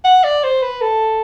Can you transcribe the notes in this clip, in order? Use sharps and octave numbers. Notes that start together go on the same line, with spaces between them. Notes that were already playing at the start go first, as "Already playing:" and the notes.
F#5
D5
C5
B4
A4